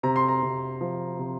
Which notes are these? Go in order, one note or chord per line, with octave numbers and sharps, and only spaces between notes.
C3 A#5
C6
A#5
C3
F3
C3